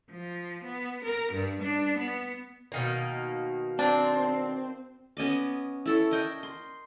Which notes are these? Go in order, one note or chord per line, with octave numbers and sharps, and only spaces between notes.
F3
B3
A#4
G2
D4
B3
B2 D#3 A#3
C4 D4
B3 C#4 D#5 D6
E4 A4 C#5
A#4 D#5 G5
C6